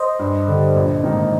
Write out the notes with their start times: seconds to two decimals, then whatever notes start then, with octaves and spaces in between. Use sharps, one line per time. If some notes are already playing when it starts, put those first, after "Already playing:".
Already playing: C5 D#5
0.19 G2
0.48 D3 G3
0.76 A#1
1.03 G#2 D#3 A#3 D#4